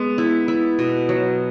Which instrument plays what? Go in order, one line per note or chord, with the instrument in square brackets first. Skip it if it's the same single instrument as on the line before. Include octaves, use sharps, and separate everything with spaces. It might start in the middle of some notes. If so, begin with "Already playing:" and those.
Already playing: [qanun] G#3 [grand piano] B3
[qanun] E4
E4
B2
F#3